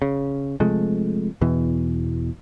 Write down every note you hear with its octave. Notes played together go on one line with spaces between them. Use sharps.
C#3
C3 F3 G#3 A3
E2 B2 E3